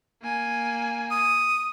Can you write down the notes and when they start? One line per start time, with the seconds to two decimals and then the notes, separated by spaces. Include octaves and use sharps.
0.22 A#3 G#5
1.11 D#6